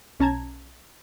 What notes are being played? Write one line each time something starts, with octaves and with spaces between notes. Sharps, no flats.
B1 C#4 A5 A#5 G#6